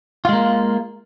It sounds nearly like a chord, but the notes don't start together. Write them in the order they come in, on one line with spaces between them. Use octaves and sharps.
F4 G#3 A#3